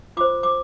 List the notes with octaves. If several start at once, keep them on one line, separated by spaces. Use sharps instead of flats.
F4 C5 D6
D6